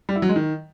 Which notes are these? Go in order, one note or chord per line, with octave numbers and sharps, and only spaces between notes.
G3
E4
F#3
G#3
D#3